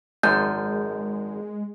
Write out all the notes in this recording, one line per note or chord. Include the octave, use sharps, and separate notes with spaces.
G#1 F#2 F3 G#3 G6